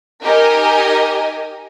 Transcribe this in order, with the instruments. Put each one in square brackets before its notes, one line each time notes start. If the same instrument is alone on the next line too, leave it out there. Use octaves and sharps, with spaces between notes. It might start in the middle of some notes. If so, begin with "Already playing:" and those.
[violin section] D#4 G4 A#4 D#5 G#5